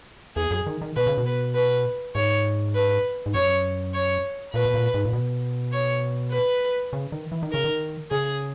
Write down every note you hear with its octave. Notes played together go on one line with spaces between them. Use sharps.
E2 G#4
F#2
D#3
D#3
B2 B4
C#3
B2
B4
B4
G#2 C#5
B4
G#2
F#2 C#5
C#5
A#2 B4
B2
A#2
G#2
A#2
B2
C#5
B4
C#3
D#3
E3
D#3
C#3 A#4
D#3
C#3 G#4